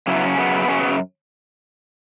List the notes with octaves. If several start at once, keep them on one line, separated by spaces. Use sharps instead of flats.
F#2 C#3 F#3 E4
B3
C#4
F#2 C#3 F#3 B3
F#2 C#3 F#3 C#4
B3